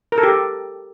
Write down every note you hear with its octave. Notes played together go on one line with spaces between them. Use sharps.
A#4
A4
G4